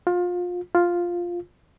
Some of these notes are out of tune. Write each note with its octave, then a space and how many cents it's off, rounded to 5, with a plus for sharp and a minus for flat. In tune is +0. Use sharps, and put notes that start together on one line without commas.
F4 +25
F4 +0